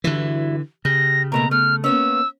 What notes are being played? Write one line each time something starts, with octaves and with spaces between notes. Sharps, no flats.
G2 D3 E3 E4 F#4
C#3 G4 A#6
B2 A3 A#3 A#5
A3 F6
A#3 B3 C#4 E6